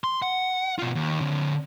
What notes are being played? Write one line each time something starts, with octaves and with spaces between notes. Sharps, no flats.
C6
F#5
B2 F4
D#2
D3 C4